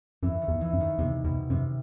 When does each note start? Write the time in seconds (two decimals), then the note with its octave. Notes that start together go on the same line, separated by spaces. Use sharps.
0.23 F#2 E3
0.41 D#3
0.48 E2
0.61 E3
0.73 F#2
0.80 D#3
0.98 E2 C3
1.24 E2 B2
1.50 F#2 C3